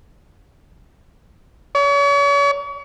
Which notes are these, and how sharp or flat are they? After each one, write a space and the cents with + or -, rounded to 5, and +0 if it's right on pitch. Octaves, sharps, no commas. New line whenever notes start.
C#5 +40